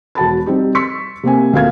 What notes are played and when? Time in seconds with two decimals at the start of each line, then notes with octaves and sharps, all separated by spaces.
0.15 E1 F#4 A5 B5 A6
0.46 G3 C4 D#4 G4
0.75 C6 C#6 E6 B6 C#7
1.23 C3 A#3 C4 G#5
1.53 D2 A#2 F5 G#6